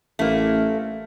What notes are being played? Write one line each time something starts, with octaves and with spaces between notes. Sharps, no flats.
A1 A3 A#3